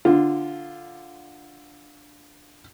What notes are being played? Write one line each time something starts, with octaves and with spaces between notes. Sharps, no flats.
D3 F4